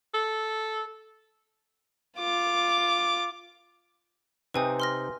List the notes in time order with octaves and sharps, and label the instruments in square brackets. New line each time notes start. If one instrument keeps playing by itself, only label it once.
[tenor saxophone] A4
[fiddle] F4 D6
[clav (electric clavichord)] C3 C4 D#4 [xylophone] B4 G#5 D#6
[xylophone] C6 F6 A#6